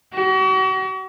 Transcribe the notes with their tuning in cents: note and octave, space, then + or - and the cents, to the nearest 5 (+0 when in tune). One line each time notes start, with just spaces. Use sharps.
F#4 +40